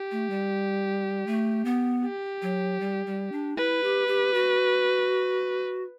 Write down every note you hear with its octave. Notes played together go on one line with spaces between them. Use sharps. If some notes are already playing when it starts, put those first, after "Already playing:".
Already playing: G4
A3
G3
A3
B3
G4
F#3
G3
G3
D4
E4 B4
G4
G4
F#4